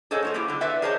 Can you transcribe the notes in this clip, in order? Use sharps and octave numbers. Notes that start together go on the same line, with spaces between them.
G#4 A4 C5 C#5 D#5 F#5
A3 F4 C#5
A#3 B3 E4 G4
D3 F#3
F4 B4 D5 E5 F#5
G#4 A#4 C5 C#5 D#5 A5